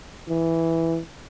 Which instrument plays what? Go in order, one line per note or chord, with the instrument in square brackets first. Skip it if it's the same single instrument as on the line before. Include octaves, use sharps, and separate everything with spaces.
[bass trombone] E3